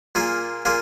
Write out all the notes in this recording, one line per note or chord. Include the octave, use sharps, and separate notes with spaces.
A#2 A#3 F4 G#4
A#2 A#3 F4 G#4